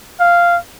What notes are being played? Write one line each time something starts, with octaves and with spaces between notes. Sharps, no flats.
F5